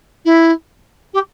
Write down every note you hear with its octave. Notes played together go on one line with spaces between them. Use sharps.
E4
G4